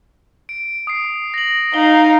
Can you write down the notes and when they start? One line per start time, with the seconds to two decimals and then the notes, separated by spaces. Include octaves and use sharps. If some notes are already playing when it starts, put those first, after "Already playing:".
0.49 D7
0.87 D#6 C7
1.34 A#6 F#7
1.74 D#4 F5 G7